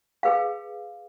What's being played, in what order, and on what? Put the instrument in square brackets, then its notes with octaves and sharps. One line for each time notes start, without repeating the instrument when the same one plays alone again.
[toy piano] G#4 B4 F5